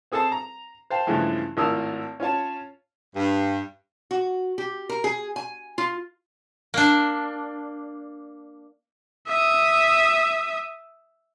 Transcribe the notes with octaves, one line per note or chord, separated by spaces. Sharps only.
C4 G#4 A4 C5 A5
A#5
C5 F5 G5 A5
G2 C#3 E3 F3 G#3 A3
G#1 A2 F4 A#4 D#6 E6
C#4 F4 C#5 A5
G2
F#4
G4
A#4
G#4
G#5
F4
A#3 D4
E5 D#6